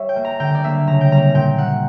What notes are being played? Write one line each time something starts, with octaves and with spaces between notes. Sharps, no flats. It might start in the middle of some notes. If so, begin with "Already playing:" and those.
Already playing: G3 C#5 E5
G5
A#3
A#5
D3 G5
D5
F#3 A#3 E5
C#3 A#5
G5
G3 A#3 A#5
A#2 G5
G3 A#3 F#5